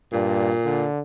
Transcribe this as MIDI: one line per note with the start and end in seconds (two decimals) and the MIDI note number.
0.13 0.53 43
0.13 0.86 46
0.65 1.02 50